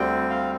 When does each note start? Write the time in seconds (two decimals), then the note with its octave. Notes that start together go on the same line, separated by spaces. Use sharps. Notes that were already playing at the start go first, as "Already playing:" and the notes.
Already playing: D2 D3 G3 C4 G5
0.29 F5